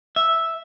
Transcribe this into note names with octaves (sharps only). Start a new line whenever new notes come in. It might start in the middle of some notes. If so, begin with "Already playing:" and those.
E5